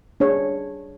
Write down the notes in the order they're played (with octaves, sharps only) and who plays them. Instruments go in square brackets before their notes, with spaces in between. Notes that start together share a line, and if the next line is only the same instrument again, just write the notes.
[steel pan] D4 G#4 C#5